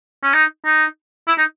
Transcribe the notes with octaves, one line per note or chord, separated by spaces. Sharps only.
C#4
D#4
D#4
E4
D#4